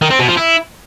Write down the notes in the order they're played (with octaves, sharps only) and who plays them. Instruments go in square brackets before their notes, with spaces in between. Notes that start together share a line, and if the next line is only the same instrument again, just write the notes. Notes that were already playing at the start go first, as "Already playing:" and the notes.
[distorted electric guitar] D#3
C4
B2
F3
E4